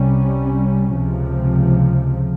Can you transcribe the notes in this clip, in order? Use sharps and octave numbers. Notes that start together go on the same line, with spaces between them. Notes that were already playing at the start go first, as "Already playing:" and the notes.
Already playing: C2 C3 G3 C#4
C#2 C3 F3